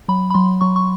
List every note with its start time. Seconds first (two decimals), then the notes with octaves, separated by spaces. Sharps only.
0.08 F#3 B5
0.30 B5
0.34 F#3 C6
0.61 F#3 C#6
0.76 C#6